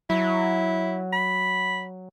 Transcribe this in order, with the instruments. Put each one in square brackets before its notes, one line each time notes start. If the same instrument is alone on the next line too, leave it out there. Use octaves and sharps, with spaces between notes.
[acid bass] F#3 [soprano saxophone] E4
[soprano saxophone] B5